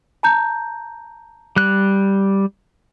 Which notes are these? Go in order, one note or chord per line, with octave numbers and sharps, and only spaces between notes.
A5 A#5 G6
G3 F#6